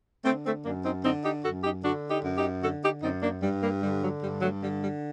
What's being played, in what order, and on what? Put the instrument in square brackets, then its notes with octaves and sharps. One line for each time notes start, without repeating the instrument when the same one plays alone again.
[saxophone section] D3 A3 C4
A3 C4
F#2 A#3 D4
C4 D#4
D3 C4 D#4
D#4 G4
F#2 F#4 A4
D#4 G4
D3 D4 F#4
D#4 G4
F#2
D#4 G4
D3 F#4 A4
D#4 G4
F#2 C4 D#4
A#3 D4
G2 G3
G3 A#3
D3 G3
F#3
G2 G3
F#3 A3
D3 G3
G3